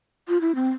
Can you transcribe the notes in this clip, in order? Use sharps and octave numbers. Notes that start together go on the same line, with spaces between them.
F4
E4
C4